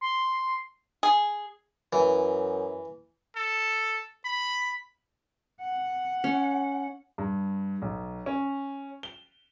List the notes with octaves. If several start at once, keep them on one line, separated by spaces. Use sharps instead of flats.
C6
G#4
F#2 E3
A4
B5
F#5
C#4
G2
B1
C#4
G7